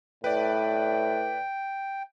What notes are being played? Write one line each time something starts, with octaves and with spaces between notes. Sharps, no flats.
A2 B4 D5 G5